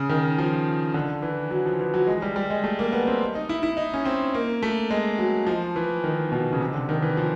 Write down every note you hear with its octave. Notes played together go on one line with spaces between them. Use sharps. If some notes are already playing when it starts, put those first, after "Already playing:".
Already playing: C#3
D#3
F3
D3
E3
F#3
F3
E3
F#3
G#3
G3
G3
G#3
A3
A#3
B3
C4
D#4
E4
E4
D#4
C#4
C4
A#3
A3
G#3
F#3
F3
E3
D#3
B2
C#3
C3
D3
D#3
E3
F3